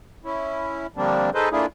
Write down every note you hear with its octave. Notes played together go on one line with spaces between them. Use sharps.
C#4 E4
D3 F3 G3 A#3 C4 D4
D#4 G#4 A4 B4 C5 D#5
A3 A#3 D4 E4 F4 G#4